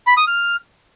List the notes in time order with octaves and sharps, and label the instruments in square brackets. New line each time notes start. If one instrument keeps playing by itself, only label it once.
[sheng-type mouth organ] B5
D#6
F6